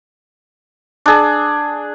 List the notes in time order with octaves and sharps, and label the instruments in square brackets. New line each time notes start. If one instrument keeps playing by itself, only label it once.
[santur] D4 G#4